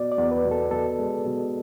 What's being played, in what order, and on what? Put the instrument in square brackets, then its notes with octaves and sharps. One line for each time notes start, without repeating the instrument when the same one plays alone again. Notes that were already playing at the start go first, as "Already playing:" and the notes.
Already playing: [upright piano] B2 [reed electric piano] D5
[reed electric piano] D5
[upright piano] E2
[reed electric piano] B4
[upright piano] B2
[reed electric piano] A4
[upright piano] B2 [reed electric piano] A4
[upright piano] G#3
B2